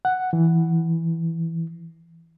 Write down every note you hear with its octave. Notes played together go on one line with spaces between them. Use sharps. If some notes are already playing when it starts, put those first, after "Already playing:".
F#5
E3